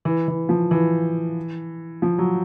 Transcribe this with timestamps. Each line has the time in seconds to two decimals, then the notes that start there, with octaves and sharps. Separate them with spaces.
0.05 E3
0.28 E3
0.49 F3
0.71 E3
2.02 F3
2.18 F#3